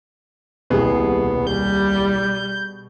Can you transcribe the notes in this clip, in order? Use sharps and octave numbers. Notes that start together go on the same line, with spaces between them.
D#1 C2 B2 B3 G#4
G3 G6